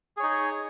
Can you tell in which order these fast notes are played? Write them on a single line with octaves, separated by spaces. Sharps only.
G#4 C#5 D#4